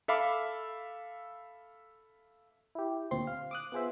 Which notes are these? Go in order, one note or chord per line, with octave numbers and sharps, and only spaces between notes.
A4 E5 F5 B5 D6
E4 G4
D2 A#2 C4 C6
F5
D6 D#6 F#6
B3 F4 G#4 C5 E5